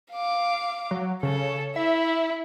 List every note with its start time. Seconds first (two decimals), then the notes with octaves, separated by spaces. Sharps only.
0.12 F5 D6
0.91 F#3
1.23 C#3 A4 C#5
1.76 E4 E5